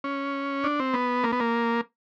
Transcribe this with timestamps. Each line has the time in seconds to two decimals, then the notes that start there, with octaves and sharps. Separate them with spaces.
0.04 C#4
0.64 D4
0.80 C4
0.94 B3
1.24 A#3
1.32 B3
1.40 A#3